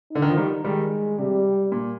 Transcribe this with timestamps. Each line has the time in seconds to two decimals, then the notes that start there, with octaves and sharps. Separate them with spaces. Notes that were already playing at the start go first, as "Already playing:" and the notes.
0.11 D3 D#4
0.22 D#3
0.30 F3
0.37 D#3 G3
0.64 D#3 G3 G#3
1.18 C3 G3
1.72 A#2